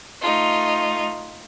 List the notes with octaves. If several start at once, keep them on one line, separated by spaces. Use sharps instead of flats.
A3 D#4 F4